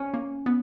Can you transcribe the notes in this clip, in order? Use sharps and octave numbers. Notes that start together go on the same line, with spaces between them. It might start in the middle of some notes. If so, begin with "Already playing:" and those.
Already playing: C#4
A#3
B3